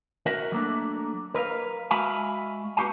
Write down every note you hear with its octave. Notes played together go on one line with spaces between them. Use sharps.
F#4 A#4 E5 F#5
F#3 A3 A#3 D4
A#4 B4 E5 F5
G#3 F#4 E5 F5 G#5 B5
B3 F#4 G4 F5 G#5